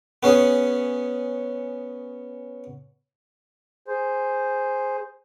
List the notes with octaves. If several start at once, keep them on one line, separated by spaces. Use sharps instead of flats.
B3 C#4 G#4
G#4 C5